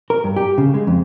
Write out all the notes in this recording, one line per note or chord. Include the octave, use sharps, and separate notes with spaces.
A#4
G2
G4
C#3
G#3
F2